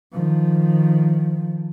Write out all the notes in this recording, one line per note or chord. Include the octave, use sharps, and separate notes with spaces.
D#3 F3